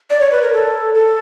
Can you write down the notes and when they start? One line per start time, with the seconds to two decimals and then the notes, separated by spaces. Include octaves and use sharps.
0.10 D5
0.21 C#5
0.32 B4
0.42 A#4
0.53 A4
0.94 A4